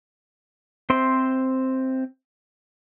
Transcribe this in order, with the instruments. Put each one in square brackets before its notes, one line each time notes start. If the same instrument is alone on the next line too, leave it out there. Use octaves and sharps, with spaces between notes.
[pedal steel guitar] C4 C5 E5 C6